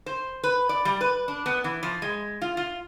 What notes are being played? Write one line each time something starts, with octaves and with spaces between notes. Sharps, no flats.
C5
B4
D5
G3
B4
D4
B3
E3
F3
G#3
F4
F4